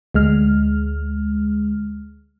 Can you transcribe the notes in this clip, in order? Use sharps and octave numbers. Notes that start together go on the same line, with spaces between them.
D2 G#3 F6